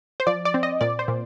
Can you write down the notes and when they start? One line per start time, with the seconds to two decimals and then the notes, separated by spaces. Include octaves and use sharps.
0.20 C5
0.27 F3 D5
0.45 D5
0.54 C4
0.63 D#5
0.81 A#2 D5
0.99 C5
1.08 A#2